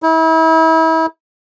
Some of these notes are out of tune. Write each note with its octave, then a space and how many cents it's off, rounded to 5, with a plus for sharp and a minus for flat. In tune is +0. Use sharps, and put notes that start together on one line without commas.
E4 -35